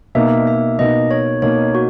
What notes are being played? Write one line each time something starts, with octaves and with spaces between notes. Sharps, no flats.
B2 A#3 D#4 E5
E5
B2 A#3 D#4 D#5
C#5
B2 A#3 D#4 C#5
F#4